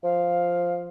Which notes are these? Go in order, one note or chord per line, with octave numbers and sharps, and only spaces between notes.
F3 F5